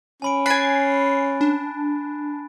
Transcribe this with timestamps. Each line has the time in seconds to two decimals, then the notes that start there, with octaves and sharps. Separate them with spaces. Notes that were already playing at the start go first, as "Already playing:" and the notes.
0.22 C#4 G#5 B5 D7
0.46 G#5 B5 F#6 A6 C7 D7
1.41 D4